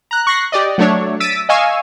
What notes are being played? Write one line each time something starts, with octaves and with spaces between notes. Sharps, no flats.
A#5 F#6
C#6 F#6 A#6 C7
G4 D5 D#5
F#3 A3 D4 C#5
E6 A6 B6 D7 D#7
D#5 F5 G#5 C#6 E6